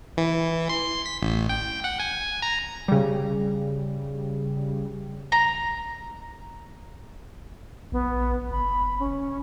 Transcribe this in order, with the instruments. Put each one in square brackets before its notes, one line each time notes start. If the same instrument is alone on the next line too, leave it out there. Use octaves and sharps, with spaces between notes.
[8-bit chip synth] E3
C6
B6
A1
G5
F#5
G#5
A#5
[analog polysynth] C#3 G3
[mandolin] A#5
[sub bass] A#1 [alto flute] B3
[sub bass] F#1 [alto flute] B5
[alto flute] C#4